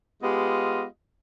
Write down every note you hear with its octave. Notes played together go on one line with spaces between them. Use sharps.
G#3 B3 F4 G4 D#5